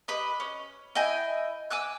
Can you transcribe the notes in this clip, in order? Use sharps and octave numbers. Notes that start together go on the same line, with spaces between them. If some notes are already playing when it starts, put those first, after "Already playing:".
G4 B4 D#5
C#4
E4 D#5 G5 G#5
G#5 D6 E6 F#6